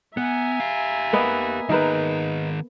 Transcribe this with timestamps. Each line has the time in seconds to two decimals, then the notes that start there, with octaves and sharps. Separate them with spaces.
0.17 B3 E5 F#5 G#5 A#5
0.60 G4 F5
1.13 A#3 B3 D#5
1.69 D#3 D#4 G#4 A#4 B4